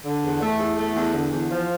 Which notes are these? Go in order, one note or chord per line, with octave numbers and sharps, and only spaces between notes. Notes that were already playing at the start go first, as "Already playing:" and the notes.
D3
E2
A3
E2
A3
E2
D3
E2
F3